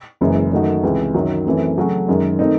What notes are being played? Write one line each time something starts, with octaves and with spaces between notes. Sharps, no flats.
F#1 F#2 E3 G#3
F#2 D#3 A3 D#4 F#4
C#2 C3 E3
F#2 D#3 F#3
F#2 E3 A3 C4
C#3 F#3 A3 C#4 F#4
F#2 D#3 G#3
D#3 A3 C4 D#4